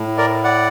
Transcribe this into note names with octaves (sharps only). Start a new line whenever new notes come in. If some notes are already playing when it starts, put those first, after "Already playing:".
Already playing: A2
A#4 D5
D5 F#5